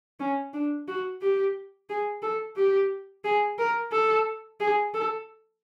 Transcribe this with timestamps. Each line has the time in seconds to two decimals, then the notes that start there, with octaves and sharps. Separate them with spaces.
0.20 C#4
0.53 D4
0.88 F#4
1.22 G4
1.90 G#4
2.22 A4
2.56 G4
3.24 G#4
3.59 A#4
3.92 A4
4.60 G#4
4.94 A4